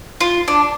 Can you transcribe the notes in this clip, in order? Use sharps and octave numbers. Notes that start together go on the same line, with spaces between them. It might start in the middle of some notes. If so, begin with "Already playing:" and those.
F4
D4